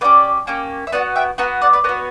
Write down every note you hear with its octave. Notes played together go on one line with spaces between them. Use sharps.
A#3 C#4 G4 B4 D5
A#3 C#4 G4
E5
B3 F#4 D5 F#5
E5 G5
B3 F#4 F#5 A#5
D5 F#5
B4 D5
B3 F#4 A#4 C#5